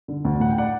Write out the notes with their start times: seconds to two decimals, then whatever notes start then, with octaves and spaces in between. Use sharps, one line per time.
0.08 D3
0.25 D2
0.40 A2 F#5
0.50 G5
0.58 D5 F#5